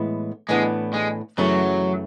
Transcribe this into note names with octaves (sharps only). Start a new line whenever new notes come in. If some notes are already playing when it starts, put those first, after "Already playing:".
Already playing: A2 E3 G#3 B3 E4
A2 E3 G#3 B3 D4
G#3
F#2 C#3 E3 F#3 A3 C#4